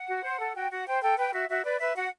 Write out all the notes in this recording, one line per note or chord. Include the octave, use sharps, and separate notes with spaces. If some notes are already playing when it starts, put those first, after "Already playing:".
Already playing: F#5
F#4
C5
A4
F#4 G5
F#4 F#5
C5 G5
A4 G5
B4 G5
F#4 E5
F#4 E5
B4 D5
B4 E5
F#4 F#5